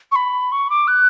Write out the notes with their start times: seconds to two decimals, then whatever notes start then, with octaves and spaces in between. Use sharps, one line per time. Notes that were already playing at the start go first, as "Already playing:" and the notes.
0.12 C#6
0.16 B5
0.52 C#6
0.70 D6
0.88 F#6